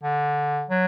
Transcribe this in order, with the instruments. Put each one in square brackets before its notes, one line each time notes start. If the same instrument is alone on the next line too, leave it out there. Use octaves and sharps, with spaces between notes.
[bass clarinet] D3
F#3